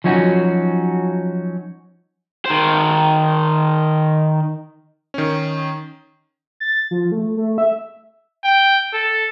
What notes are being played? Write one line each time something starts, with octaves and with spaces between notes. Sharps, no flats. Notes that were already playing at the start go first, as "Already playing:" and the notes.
F3 F#3 C#4 D#4 F#4
D#3 C5
D#3 C#4
A6
F3
A3
A3
E5
G5
A4